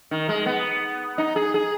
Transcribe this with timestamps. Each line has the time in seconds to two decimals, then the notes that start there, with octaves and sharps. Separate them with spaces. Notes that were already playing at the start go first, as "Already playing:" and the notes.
0.11 D#3
0.29 G#3
0.46 B3
1.18 D#4
1.36 G#4
1.54 G#4